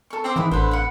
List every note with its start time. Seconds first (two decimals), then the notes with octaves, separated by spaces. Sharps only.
0.10 A4 C#6
0.24 C4 C5 D6
0.36 G#2 E3 E4 B4 D#6
0.51 A1 D3 B4 C5
0.71 B4 F#5